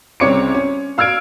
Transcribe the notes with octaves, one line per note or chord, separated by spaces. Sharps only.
C2 C#3 C4 C#5 D6 C#7
C#4
F5 E6 F6 G#6 D7